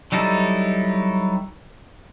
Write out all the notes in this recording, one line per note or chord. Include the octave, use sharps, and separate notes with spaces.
F#3 G3 D#4 E4 A4